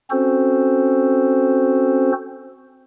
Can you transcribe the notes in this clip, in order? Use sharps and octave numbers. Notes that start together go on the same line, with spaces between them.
C4 C#4 F#4 A4 C5